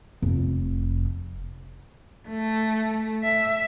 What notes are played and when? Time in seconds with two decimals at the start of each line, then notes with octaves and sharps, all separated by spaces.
0.22 F1
2.29 A3
3.24 E5